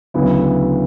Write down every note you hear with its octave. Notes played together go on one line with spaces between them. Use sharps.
D2 C#3 F#3 B3 E4